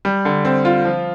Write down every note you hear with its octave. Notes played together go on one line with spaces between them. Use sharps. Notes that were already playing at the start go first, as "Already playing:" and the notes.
G3
D3
C4
F4
F3